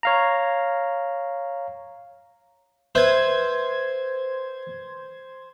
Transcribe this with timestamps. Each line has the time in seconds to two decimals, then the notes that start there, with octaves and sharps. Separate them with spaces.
0.03 C#5 F5 A#5
2.95 B4 C5 E5 G#6